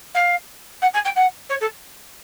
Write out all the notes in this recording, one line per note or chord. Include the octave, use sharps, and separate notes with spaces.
F5
F#5
G#5
G5
F#5
C#5
A4